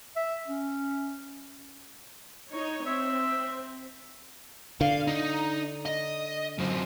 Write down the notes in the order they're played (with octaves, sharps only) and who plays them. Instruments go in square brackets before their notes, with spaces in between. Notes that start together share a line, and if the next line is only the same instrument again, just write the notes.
[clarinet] E5
C#4
[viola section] D#4 C#5
[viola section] C4 [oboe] E5
[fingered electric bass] D3 [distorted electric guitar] F5
[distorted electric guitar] D#4
D#5
F#2 C4